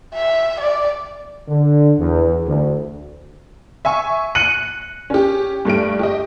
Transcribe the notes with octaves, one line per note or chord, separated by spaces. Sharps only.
E5
D5
D3
E2
D2
E5 G#5 C#6
F#6 C#7 D#7 F#7
C#4 G4
G2 A3 G4 D7
G4 D#5